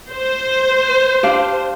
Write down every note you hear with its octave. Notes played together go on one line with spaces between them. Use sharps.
C5
D4 G4 F5